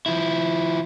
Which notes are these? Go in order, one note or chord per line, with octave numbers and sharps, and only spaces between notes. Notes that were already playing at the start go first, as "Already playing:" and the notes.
F3 E4